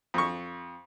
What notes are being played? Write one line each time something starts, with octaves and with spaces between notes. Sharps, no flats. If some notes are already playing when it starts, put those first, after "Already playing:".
F2 C#6